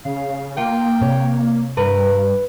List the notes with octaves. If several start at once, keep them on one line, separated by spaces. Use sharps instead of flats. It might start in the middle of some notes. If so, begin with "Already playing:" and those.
C#3 F5
A#3 F4 G5
C3 C#5
G2 A#4 B4